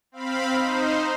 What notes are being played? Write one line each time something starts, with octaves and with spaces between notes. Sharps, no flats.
C4 F5 B5
D#4 C5